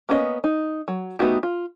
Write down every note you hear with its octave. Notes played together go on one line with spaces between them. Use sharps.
A#3 B3 C#4 C5 D#5
D#4
F#3
A3 B3 D#4 F#4 G4
F4